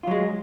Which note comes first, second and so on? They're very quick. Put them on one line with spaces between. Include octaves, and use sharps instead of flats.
F4 F#3 G#3